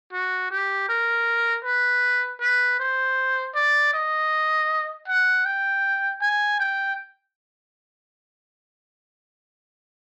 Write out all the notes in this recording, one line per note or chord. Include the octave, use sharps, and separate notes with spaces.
F#4
G4
A#4
B4
B4
C5
D5
D#5
F#5
G5
G#5
G5